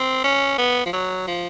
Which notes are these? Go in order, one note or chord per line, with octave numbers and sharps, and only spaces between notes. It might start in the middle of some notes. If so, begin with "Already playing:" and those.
Already playing: C4
C#4
B3
F3
F#3
F3